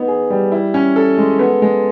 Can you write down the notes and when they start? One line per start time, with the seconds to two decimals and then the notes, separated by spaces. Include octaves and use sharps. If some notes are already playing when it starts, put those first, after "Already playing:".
Already playing: B3 D#4
0.08 G#4
0.30 G3
0.52 E4
0.74 C#4
0.96 A4
1.18 G#3
1.39 B3
1.62 G#3